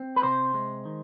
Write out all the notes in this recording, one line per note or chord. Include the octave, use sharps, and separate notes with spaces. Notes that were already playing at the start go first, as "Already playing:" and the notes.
Already playing: C4
B4
C3 C5
G#3
D#3